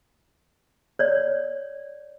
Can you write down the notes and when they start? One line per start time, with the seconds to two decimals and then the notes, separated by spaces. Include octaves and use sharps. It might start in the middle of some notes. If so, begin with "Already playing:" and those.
0.99 C#5 D5